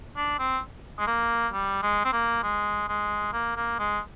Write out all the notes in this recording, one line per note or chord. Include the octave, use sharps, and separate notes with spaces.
D4
C4
G#3
A#3
G3
G#3
C4
A#3
G#3
G#3
A#3
A#3
G#3